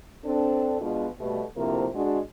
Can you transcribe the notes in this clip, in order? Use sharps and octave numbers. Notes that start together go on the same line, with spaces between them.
C4 D4 A4
B2 G#3 B3 D4 F4
B2 G3 A3
D2 C3 F3 A#3 E4 A#4
G#3 D4 F#4